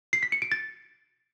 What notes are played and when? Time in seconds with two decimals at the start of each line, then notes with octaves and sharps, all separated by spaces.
0.13 C7
0.23 B6
0.32 C#7
0.42 D7
0.52 A6